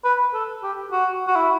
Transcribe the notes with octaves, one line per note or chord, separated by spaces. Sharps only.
B4
A4
G4
F#4
F#4
E4